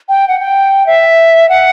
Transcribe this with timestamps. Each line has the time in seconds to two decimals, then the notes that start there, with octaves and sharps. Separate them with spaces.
0.09 G5
0.28 F#5
0.39 G5
0.86 E5
1.49 F#5